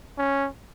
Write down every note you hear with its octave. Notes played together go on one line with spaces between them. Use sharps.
C#4